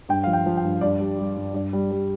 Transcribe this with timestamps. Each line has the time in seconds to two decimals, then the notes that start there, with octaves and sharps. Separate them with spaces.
0.09 G2 G5
0.24 F3 F5
0.33 G5
0.46 F3
0.57 G5
0.63 G2
0.81 G2 D5
1.00 G3
1.19 G3
1.36 G2
1.54 G2 D5
1.73 G3
1.91 G3